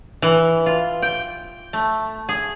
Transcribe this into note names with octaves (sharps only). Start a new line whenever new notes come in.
E3
F4
G5
A3
G#4